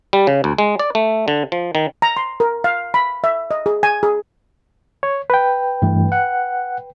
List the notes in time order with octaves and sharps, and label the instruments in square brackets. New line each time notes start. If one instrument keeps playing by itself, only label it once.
[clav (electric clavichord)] G3
C#3
D2
G#3
D5
A3
D3
F3
D#3
[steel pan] A#5
C6
A#4
F5
B5
E5
D#5
G#4
G#5
G#4
[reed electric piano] C#5
B4 G5
[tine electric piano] G2 E3 A3
F#5